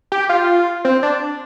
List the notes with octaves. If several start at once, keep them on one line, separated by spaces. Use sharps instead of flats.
G4
F4
C4
D4